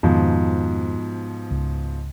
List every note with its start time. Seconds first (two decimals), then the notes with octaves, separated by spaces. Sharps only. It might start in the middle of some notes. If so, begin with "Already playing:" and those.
0.03 F2 G#2 B2 D#3 F3
1.51 C#2